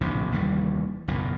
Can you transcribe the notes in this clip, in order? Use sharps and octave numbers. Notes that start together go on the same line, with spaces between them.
D1 A#1 A2 C3
F1 D#2 E3 G3
F#1 B1 E2 A#2